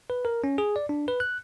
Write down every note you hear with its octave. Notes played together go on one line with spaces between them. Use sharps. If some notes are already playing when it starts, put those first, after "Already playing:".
B4
A#4
C#4
G#4
D5
D4
B4
F#6